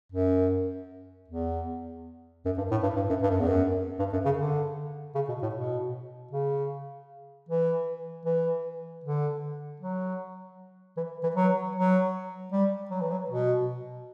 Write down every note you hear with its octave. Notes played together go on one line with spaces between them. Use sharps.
F#2
E2
F#2
G2
A2
G2
G2
F#2
G2
F#2
E2
F#2
G2
F#2
C#3
D3
C#3
B2
A2
B2
C#3
E3
E3
D3
F#3
E3
E3
F#3
F#3
G3
F#3
E3
F#3
B2